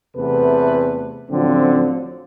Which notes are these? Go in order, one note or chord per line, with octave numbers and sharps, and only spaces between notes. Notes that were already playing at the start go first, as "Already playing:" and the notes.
E2 C3 A3 B3 A4 B4
A1 D3 F3 F#3 C4